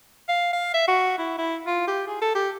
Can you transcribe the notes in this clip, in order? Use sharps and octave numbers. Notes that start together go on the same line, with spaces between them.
F5
F5
E5
F#4
E4
E4
F4
G4
G#4
A4
G4